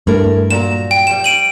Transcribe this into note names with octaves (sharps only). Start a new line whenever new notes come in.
G2 A3 E4 A#4
A#2 F#3 A#5 E7
G5
F3 G3 E7
D7 D#7 F#7